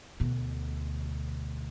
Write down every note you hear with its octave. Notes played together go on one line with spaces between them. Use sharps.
D2 B2